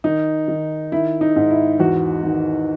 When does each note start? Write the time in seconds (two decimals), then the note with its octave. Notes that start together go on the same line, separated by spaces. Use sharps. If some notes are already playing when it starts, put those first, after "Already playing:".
0.04 D#3 D#4
0.48 D#3
0.92 D#3 E4
1.21 D#4
1.36 G#2
1.51 E4
1.80 E2 F#4
2.24 D#3